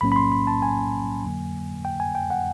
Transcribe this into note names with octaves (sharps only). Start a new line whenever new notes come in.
B1 A2 F#3 A#3 C#4 B5
B5
C6
B5
A5
G#5
F2 D3 F#3 A#3
G5
G#5
G5
F#5